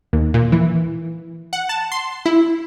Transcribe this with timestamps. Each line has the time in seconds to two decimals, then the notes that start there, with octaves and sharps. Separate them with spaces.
0.13 D#2
0.34 A#2
0.52 E3
1.53 F#5
1.69 A5
1.92 C6
2.26 E4